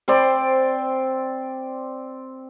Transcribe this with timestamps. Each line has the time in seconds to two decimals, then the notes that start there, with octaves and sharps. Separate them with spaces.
0.08 C4 C5 D5